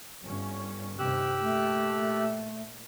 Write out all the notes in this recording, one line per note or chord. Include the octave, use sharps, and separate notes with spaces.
G1 G2 C#4
G1 C3 D#3 G4 E6 F#6
A#2 A3